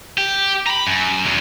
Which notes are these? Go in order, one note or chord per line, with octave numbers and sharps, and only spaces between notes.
G4
A#5 B5
F#2
E2